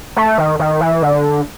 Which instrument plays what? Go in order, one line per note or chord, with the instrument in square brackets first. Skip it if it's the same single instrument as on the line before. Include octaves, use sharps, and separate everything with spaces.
[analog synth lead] A3
D#3
D#3
E3
D3